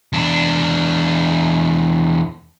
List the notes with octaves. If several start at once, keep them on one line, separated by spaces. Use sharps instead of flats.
E2 D4